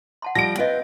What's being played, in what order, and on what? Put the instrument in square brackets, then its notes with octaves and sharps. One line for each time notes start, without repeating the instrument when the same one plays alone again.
[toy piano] F#5 A5 C6
[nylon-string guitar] F3 G3 [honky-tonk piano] A#6 D7
[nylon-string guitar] C4 B4 C5 [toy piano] D#5 F5